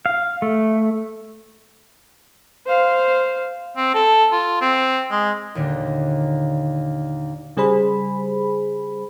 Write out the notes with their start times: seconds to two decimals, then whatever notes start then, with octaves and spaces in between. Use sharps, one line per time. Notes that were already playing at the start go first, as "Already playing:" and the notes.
0.06 F5
0.42 A3
2.67 C5 F5
3.77 C4
3.95 A4
4.32 F4
4.61 C4
5.11 G#3
5.55 D#2 A#2 D3
7.57 C#3 G3 G#4 C5 B5